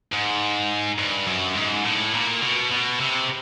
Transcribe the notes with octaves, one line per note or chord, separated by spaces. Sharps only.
G#2
G2
F#2
G#2
A2
A#2
B2
B2
C3